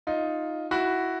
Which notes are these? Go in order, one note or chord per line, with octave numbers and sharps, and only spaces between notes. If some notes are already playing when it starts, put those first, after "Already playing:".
D#4 F4
E4 F#4